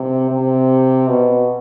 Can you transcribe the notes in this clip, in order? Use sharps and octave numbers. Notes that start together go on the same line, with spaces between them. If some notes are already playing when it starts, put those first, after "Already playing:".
Already playing: C3
C3
B2